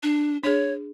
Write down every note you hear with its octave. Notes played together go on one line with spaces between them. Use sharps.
D4
D4 G#4 C#5